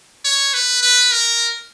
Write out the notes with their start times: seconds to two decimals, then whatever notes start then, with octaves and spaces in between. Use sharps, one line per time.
0.25 C#5
0.54 B4
0.83 B4
1.12 A#4